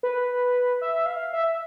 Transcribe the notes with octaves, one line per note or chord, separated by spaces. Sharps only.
B4
E5
F5
E5